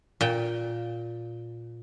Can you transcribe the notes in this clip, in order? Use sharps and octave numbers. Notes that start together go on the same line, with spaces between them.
A#2 G5